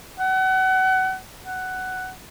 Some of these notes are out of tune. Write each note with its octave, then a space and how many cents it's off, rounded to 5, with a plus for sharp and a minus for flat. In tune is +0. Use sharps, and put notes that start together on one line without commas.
F#5 +30
F#5 +10